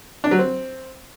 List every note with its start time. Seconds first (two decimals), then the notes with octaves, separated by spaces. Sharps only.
0.24 D4
0.31 F#3
0.39 C4